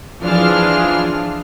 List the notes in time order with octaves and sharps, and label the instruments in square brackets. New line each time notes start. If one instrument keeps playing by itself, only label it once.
[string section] E3 F3 D4 F4 G#4 F6